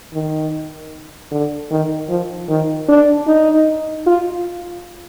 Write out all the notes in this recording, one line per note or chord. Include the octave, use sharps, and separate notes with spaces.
D#3
D3
D#3
F3
D#3
D4
D#4
F4